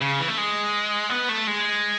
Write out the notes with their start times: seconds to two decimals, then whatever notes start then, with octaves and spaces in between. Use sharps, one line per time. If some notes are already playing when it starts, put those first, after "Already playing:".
0.01 C#3
0.19 E3
0.28 A3
0.38 G#3
1.10 B3
1.29 A3
1.47 G#3